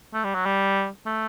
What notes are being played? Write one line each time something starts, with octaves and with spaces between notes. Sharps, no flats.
A3
G3
F#3
G3
A3